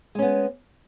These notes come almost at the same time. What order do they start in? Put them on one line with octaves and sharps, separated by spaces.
G#3 C#4 B3